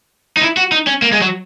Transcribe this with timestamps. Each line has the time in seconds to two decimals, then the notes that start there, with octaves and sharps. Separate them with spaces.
0.37 D#4
0.41 E4
0.57 F#4
0.72 D#4
0.87 C#4
1.02 A#3
1.12 G#3
1.21 F#3